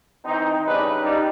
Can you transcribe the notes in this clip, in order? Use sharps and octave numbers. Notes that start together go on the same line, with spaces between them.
E3 C4 D#4
C#3 G3 D4 D#4 B4
G3 D#4